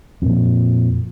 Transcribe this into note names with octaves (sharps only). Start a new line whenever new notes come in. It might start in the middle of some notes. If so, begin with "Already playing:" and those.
F2 A#2